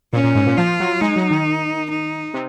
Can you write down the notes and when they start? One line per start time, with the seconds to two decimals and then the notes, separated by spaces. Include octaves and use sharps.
0.13 A#2 C#4
0.24 A#2
0.35 G#2
0.46 A#2
0.58 F3 F4
0.80 F#3
1.01 G#3 D#4
1.16 F#3
1.31 D#3
1.90 D#4
2.34 C3